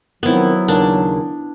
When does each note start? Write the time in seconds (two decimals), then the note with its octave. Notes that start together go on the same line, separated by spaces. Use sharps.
0.23 D#3 F3 F#3 B3 C4 E4
0.68 D#2 C#3 A#3 D4